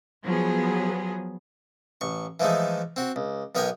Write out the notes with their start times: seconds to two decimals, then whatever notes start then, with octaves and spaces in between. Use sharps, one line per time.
0.23 F3 F#3 B3 G#4
2.01 A1 C#6
2.40 E3 F3 G#3 A3 D#4
2.96 C4 F#4
3.16 C#2
3.55 B1 B3 A#4 D#5 G5 G#5